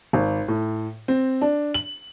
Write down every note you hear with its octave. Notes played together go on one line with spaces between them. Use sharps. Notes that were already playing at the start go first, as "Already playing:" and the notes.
G#1
A2
C4
D4
F#7